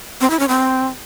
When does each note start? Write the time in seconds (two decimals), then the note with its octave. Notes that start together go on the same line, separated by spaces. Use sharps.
0.21 C4
0.30 E4
0.39 C#4
0.49 C4